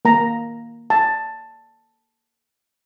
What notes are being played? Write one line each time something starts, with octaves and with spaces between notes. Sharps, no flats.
A#3 A#5
A5